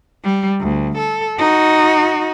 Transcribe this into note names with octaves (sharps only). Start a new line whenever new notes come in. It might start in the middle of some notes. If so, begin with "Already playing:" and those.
G3
D2
A4
D#4 F#4